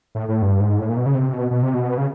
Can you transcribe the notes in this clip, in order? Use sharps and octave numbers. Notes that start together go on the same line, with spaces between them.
A2
A2
G2
G#2
A2
A#2
B2
C#3
C3
B2
B2
C3
B2
C#3